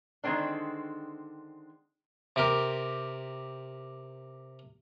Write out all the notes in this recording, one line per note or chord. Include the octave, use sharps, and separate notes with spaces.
D3 D#3 G#3 A3 C4 D4
C3 G4 A#4